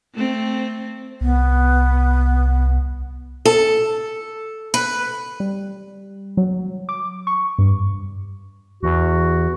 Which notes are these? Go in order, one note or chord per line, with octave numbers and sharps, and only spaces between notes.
A3 C4
C2 B3
A4
B4
G3
F#3
D6
C#6
G2
E2 F#4